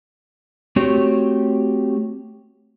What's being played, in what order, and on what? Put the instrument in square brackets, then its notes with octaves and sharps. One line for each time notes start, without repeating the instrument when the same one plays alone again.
[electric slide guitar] A3 C4 F#4 G4 C#5